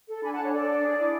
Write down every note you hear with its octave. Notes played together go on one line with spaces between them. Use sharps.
A4
D4 G#5 B5
F#5 A5
D4 C#5
A4 D5
D4
G#4
E4